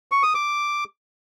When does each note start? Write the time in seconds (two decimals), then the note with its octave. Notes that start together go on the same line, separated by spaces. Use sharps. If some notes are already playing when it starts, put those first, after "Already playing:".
0.12 C#6
0.23 D#6
0.35 D6